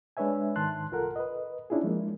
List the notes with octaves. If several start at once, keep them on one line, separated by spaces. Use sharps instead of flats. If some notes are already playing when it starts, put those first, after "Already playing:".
G#3 D4 B4 C#5 E5 G#5
G#2 D#3 A5 C6 F#6
C2 F4 A4 A#4 F#5
B4 D#5
C#4 D4 E4 F4 G#4
F3 G#3 A#3